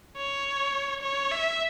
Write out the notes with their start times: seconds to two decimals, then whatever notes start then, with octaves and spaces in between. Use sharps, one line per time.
0.17 C#5
1.02 C#5
1.32 E5